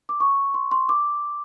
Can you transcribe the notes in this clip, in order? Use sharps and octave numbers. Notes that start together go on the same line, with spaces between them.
D6
C#6
C6
C6
D6